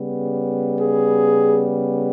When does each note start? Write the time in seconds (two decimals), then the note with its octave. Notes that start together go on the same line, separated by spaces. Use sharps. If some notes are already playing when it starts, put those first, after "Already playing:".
Already playing: C#3 G3 B3
0.80 G#4